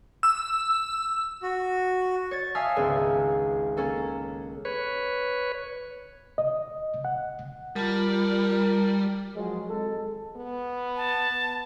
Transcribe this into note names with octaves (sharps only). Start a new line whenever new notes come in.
E6
F#4
C#5 A6
E5 F5 G#5 A5 D#6
G#1 C#2 B3 G#4
A#3 C#4 A4
B4 C#5
D#5
F#5
G3 F4 A#4 A5
F3 F#3 G#3
G#1 G#3 A4
B3
A5